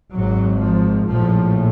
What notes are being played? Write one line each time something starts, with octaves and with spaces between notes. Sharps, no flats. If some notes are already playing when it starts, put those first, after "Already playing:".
G#1 G#2 F#3
F3
A#1 A2 F3